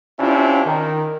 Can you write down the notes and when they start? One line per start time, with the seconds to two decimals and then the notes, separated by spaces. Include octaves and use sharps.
0.19 C3 C#4 D4 E4 F4
0.66 D#3